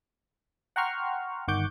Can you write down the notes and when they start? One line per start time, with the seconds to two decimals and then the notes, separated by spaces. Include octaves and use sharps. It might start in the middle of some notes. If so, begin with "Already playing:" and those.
0.76 F#5 G5 A#5 C6 C#6 F6
1.48 G1 D#3 F#5 C#6 D6 G6